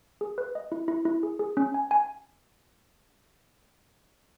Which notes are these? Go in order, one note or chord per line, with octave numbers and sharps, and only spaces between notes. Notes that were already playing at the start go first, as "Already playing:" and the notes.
G#4
B4
D#5
E4
E4
E4
G#4
G#4
C#4
G#5
G#5